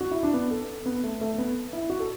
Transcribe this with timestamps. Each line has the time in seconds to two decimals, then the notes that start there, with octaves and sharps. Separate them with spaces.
0.01 F#4
0.11 E4
0.23 D4
0.34 B3
0.51 A4
0.86 B3
1.04 A3
1.21 A3
1.38 B3
1.73 E4
1.90 F#4
2.00 A4